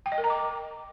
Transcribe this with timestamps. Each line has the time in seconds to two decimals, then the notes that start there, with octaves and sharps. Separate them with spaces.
0.06 G5
0.12 D#5
0.18 A#4
0.24 A#5
0.30 D6